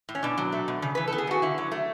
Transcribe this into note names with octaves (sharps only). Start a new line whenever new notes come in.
A2
C#4
B2 D4
F#3
A3
B2
C#3
E3 B4
A4
B3
G#4
C#3 F#4
D3 E4
F#3
A3